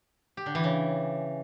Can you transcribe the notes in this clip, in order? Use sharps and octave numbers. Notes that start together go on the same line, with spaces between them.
G4
D3
E3
C#3